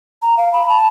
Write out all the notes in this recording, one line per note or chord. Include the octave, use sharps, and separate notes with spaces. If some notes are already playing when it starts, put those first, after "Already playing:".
A#5
F5
B5
A5